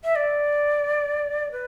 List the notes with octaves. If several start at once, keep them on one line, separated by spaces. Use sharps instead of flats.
E5
D5
B4